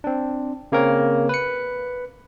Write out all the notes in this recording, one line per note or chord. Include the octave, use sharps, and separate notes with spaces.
C4 D4
C#3 A#3 C4 A#4 C#5
B4 C#7